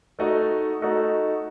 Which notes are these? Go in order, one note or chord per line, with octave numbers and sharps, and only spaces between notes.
A3 D#4 F#4 A4 D#5
A3 D#4 F#4 A4 D#5